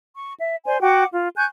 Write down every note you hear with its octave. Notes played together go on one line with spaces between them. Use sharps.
C#6
E5
C5 D5 G#5 C6
F#4 F#5 G5 D6
F4
G#5 C#6 F#6 G6